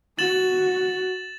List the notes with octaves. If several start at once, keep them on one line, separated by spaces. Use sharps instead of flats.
F#4 A6 E7 F#7